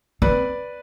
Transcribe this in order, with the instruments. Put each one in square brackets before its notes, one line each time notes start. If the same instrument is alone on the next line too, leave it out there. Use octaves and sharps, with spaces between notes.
[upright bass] C4 [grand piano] B4 D5